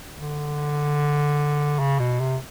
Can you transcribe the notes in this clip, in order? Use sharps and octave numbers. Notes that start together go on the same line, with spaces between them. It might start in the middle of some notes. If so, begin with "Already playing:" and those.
D3
C#3
B2
C3